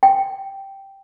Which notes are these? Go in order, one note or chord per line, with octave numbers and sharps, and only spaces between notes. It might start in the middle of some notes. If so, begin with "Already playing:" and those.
G5